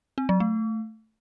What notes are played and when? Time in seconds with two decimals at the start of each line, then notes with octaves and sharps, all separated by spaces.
0.18 C4
0.29 F#3
0.40 A3